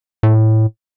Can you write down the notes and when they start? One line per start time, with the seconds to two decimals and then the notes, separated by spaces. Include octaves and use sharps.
0.23 A2